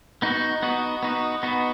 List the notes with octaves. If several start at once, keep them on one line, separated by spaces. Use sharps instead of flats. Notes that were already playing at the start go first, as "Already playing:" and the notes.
B3 D#4 F#4
B3 D#4 F#4
B3 D#4 F#4
B3 D#4 F#4